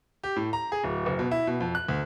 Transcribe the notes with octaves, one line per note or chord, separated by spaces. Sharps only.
G4
A2
A#5
G#4
D1
F#1
B2
E4
B2
F2
F#6
D2